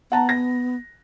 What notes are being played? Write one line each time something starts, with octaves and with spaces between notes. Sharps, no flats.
B3 F#5 A5 A#5
A#6